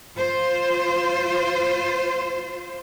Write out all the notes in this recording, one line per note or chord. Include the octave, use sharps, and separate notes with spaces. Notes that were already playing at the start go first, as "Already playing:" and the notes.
F4 C5